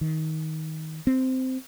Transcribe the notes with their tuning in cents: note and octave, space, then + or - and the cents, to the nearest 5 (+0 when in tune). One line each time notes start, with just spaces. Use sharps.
D#3 +20
C4 -10